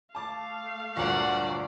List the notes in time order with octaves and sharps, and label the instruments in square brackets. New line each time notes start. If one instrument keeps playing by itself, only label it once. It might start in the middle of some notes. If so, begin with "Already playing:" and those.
[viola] A3 F5 [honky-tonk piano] A5 D6 A6
[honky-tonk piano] D2 G2 A#2 [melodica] F#3 A#3 F#4 [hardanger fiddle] D5 F#5